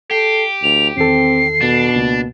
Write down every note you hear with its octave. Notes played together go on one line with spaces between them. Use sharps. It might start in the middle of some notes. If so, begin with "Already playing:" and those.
G4 A4 C7
D2 F7
E2 D#3 C4 A4 C7
B2 D4
C#2 A#3